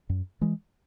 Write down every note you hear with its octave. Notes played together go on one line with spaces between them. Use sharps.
F#2
E3 G#3